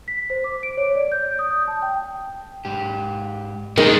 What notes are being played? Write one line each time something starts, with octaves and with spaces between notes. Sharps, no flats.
B6
C5
D6
D7
C#5
D5
G6
D#6
G6
A5
G5
G#2 G4
D#3 F#3 G#3 A#3 D4 D#4 G#4 A#4